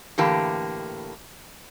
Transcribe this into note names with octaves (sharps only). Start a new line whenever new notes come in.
A2 D3 E3 A#3 G4 A5